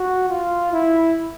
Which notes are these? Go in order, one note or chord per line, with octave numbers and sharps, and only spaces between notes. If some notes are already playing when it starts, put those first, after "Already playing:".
Already playing: F#4
F4
E4